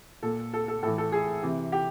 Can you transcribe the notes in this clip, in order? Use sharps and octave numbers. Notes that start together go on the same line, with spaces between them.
A#2 A4
A4
A4
A2 E3 A4
A4
G#4
C3 E3
G4